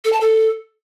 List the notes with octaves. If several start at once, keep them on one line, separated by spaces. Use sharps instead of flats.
A4
A5
A4